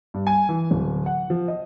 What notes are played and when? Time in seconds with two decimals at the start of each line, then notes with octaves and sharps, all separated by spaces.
0.14 G2
0.27 G#5
0.49 E3
0.71 D1
1.06 F#5
1.30 F3
1.48 D#5